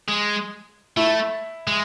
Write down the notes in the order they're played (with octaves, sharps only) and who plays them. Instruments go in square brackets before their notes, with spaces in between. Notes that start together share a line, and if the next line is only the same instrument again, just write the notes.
[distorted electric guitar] G#3
[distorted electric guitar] A3 [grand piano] E4
[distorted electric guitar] G#3